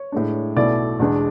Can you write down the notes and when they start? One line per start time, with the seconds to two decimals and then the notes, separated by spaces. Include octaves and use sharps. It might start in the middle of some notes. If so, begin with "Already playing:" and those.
Already playing: C#5
0.12 A2 G#3 D4
0.56 B1 B2 A3 E4 D5
0.99 E2 B2 G#3 D4